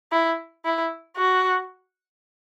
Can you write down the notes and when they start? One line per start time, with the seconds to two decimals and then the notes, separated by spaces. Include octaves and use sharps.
0.12 E4
0.65 E4
1.17 F#4